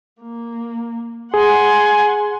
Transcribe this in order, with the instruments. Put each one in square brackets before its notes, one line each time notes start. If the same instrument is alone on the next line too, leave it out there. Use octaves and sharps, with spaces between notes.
[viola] A#3
[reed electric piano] G#4 [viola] F#5 C6 [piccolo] G#5